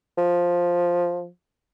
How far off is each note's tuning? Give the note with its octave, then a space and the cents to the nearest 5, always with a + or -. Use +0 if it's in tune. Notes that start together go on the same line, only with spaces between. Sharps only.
F3 +5